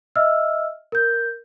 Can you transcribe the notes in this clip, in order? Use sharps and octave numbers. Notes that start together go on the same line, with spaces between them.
D#5 E5 E6 F6
A#4 G6